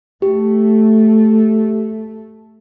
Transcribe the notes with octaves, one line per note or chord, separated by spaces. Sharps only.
A3 G4